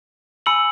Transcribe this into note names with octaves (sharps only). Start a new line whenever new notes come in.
G#5 B5 E6 C#7 F#7